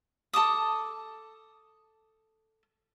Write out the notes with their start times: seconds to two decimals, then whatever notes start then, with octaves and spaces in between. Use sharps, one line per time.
0.33 A4 A5 D6 D#6